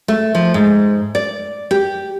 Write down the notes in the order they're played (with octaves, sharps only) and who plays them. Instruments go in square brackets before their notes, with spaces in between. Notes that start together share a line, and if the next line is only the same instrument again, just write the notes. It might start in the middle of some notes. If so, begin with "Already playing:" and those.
[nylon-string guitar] A3
F3
G#2
D5
G4